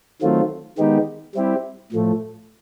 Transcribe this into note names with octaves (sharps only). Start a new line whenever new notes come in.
D#3 F#3 A3 C4 F4
D#3 G#3 B3 D#4 G4
G3 C4 E4 G4
A2 F3 A3